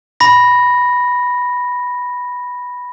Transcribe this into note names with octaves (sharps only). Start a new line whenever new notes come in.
B5 A#6